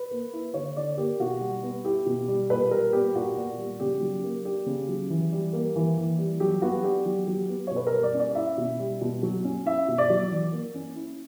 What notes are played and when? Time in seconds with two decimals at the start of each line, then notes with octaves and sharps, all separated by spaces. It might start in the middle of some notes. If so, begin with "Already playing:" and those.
Already playing: B4
0.11 A#3
0.33 E4
0.54 D3 C#5
0.76 D3 D5
0.98 A#3 G4
1.20 B2 F#4
1.41 G3
1.63 B3
1.84 E4 G4
2.06 B2
2.28 G3
2.50 A#2 B4
2.71 G3 A#4
2.93 B3 G4
3.15 A#2 F#4
3.37 A#2
3.58 G3
3.80 C#3 G4
4.01 F#3
4.24 A#3
4.44 D4 G4
4.66 C#3
4.89 F#3
5.10 E3
5.32 G3
5.53 A#3
5.76 E3
5.97 E3
6.18 G3
6.40 F#3 G4
6.62 B3 F#4
6.83 D4 G4
7.05 F#3 G4
7.28 F#3
7.48 B3
7.67 B2 C#5
7.76 B4
7.87 A#4
7.92 G3
8.03 D5
8.14 C#4
8.19 D5
8.35 E4 E5
8.58 B2
8.79 G3
9.01 B2
9.23 F#3
9.44 C#4
9.66 E4 E5
9.88 B2
9.98 D5
10.10 F#3
10.31 E3
10.52 A#3
10.74 C#4
10.96 E4